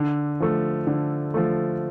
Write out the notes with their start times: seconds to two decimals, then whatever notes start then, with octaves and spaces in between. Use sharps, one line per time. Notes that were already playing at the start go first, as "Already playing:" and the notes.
Already playing: D3
0.40 F3 A3
0.87 D3
1.34 F3 A3